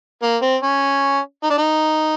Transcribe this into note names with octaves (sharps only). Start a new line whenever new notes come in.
A#3
C4
C#4
D#4
D4
D#4